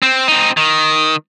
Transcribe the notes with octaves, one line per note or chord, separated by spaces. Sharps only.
C4
C4 D#4
D#3